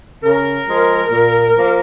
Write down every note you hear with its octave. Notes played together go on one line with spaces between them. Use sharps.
C#3 A#4
F3 G#3
A#2
F3 A#3